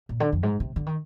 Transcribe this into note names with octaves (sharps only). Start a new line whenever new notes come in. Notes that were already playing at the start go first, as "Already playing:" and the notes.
A#2
D3
F2
G#2
C3
D3
D#3